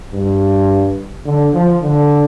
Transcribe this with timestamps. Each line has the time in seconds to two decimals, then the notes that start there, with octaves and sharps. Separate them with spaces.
0.13 G2
1.26 D3
1.54 F3
1.82 D3